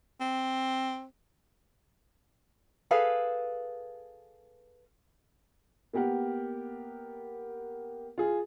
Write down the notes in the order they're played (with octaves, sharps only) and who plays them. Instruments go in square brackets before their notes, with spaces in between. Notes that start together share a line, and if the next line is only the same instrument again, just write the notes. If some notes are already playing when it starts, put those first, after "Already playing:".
[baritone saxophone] C4
[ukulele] G#4 A4 B4 F5
[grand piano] A#3 B3 G4 A#4 F#5
F4 G#4